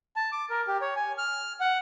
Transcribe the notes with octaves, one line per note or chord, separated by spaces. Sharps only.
A5
D6
A#4
G4
C#5
G#5
F6
F#5